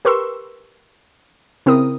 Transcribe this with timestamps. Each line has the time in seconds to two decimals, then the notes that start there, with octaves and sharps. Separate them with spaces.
0.05 G4 A#4 B4 C6 C#6 E6
1.66 C#3 C4 E4 A#4 D#6